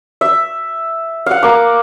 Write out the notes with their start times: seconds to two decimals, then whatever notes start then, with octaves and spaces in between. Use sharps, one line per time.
0.21 E5
1.26 F5 F#5
1.43 A#3 D6